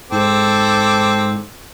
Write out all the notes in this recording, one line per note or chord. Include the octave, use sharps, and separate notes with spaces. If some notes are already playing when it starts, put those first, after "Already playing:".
G#2 C4 A4 D6